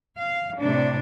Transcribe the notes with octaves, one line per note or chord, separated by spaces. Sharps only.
F5
A2 C3 D4